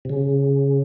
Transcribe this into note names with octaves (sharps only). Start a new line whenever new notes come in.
C3
C#3